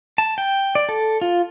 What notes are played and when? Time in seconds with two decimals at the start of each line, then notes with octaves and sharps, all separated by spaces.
0.18 A5
0.38 G5
0.75 D5
0.89 A4
1.21 F4